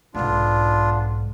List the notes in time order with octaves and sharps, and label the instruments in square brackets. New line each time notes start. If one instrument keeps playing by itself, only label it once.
[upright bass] B1 G#2 [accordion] B3 D4 F4